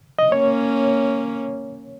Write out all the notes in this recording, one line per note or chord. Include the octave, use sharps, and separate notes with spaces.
D#5
A#3 C#4 C#5